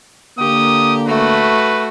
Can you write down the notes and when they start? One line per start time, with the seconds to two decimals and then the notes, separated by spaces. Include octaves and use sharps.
0.39 D3 A#3 G4 D#6
1.08 A3 F#4 B4